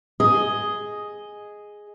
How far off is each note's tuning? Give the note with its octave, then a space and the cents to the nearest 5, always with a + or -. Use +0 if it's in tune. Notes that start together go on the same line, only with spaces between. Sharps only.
G#4 +0 D#5 +0